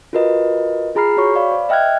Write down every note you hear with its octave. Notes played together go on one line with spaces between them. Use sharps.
F4 F#4 A#4 B4 D#5
F4 G#4 A#5 B5 F6 C7
F#4 C#5 C#6
D5 F5 B5
C5
D#5 E5 G5 F6 F#6 G#6